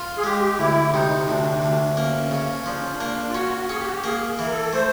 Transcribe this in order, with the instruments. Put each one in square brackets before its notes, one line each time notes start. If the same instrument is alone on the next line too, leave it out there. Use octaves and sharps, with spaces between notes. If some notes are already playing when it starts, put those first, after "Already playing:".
Already playing: [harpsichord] F4
[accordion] G#4
[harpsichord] G#3 [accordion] G4
[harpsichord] D2 [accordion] E4
[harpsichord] C3 [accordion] D#4
[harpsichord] D2 [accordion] D4
[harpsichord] D2
[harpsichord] A#3 [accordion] C#4
[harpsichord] C#3
[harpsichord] F3 [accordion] D4
[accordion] C#4
D4
[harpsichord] A#3
[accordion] F4
[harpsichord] C#4 [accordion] F#4
[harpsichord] C#4 [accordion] G#4
[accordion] G4
F#4
G4
[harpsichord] A#3 [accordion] G#4
[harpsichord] E3
[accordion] A#4
A4
[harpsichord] A3 [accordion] C5